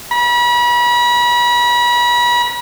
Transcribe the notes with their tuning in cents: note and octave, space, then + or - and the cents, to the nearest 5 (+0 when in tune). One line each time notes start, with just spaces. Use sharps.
B5 -35